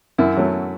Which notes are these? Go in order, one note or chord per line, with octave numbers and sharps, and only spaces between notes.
F#2 E4
F#3 A3